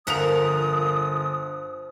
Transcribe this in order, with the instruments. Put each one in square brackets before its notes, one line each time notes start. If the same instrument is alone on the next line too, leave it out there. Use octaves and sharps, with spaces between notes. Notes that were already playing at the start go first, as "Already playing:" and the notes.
[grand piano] G1 F7 [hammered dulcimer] F3 [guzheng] A#4 E5 F#5 [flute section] D#6